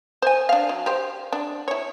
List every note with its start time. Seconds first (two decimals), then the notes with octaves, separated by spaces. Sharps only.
0.22 C5 G#5
0.49 D4 F5
0.69 F#3
0.86 G4 C5
1.33 D4
1.68 E4 C#5